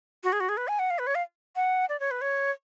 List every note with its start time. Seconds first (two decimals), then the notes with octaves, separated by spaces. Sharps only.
0.24 F#4
0.33 G#4
0.40 F#4
0.49 G#4
0.57 B4
0.68 G#5
0.79 F#5
0.90 F5
0.99 B4
1.07 C#5
1.15 F5
1.56 F#5
1.89 D5
2.00 C#5
2.11 B4
2.21 C#5